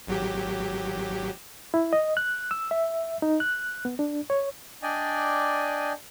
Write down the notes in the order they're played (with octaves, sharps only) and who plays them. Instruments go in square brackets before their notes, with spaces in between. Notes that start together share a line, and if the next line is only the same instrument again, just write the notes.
[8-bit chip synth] G#1 F#3 G4
[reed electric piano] E4
D#5
F#6
E6
E5
D#4
F#6
B3
D4
C#5
[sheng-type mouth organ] D4 D5 D#5 G5 G#5